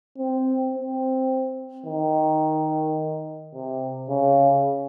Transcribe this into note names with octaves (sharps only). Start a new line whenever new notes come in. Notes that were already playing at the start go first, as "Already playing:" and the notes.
C4
C4
D#3
C3
C#3